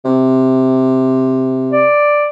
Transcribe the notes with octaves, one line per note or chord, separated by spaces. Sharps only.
C3
D5